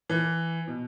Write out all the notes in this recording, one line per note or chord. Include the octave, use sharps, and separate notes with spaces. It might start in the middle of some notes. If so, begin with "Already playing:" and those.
E3
B2